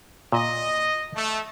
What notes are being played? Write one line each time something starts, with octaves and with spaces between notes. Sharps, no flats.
A#2 D#5
A3